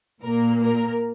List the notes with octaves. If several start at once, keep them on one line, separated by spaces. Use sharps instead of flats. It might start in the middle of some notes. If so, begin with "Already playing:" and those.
A#2 A#3 A#4
A#4